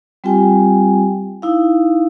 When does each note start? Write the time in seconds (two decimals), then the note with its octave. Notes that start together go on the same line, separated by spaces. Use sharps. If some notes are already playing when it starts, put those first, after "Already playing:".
0.24 G3 C4 F4 G4 G5 G#5
1.42 D#4 E4 F5